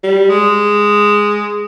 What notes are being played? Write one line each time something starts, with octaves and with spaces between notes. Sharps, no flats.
G3
G#3